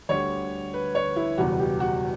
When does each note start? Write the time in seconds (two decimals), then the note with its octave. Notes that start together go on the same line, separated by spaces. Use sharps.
0.09 D2 D3 G3 C#5
0.74 B4
0.95 C#5
1.16 E4
1.38 F#1 E2 B2 G3 F#4
1.59 G4
1.80 F#4